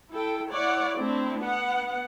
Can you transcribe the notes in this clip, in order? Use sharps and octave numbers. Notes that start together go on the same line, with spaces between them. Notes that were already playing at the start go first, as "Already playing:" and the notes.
E4 A4 G5
E4 C#5 D5 F#5
A3 C4 D4 E4
B3 F#5